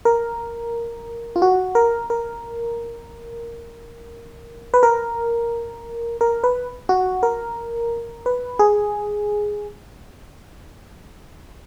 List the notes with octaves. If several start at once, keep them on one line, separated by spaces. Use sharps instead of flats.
A#4
F4
F#4
A#4
A#4
B4
A#4
A#4
B4
F#4
A#4
B4
G#4